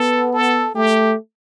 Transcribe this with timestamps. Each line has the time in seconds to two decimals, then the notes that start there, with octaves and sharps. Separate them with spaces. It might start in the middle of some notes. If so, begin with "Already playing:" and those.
Already playing: B3 A4
0.33 A4
0.75 A3 G4